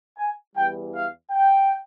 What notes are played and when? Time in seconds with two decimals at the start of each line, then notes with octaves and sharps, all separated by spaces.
0.18 G#5
0.55 E2 E3 G3 G5
0.93 F5
1.31 G5